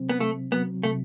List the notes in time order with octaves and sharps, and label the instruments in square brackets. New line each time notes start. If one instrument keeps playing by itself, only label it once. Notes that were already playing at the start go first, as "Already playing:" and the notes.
Already playing: [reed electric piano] C3 F#3 C4
[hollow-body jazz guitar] B3
[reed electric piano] C3 [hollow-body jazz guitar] A3
[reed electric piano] F#3 [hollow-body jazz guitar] B3
[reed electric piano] C3 [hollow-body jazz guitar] A3